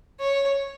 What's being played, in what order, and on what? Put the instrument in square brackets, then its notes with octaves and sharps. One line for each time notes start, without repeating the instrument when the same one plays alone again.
[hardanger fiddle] C#5